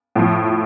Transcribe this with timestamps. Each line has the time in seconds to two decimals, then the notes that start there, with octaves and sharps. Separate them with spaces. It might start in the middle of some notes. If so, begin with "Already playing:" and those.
0.16 A2 F3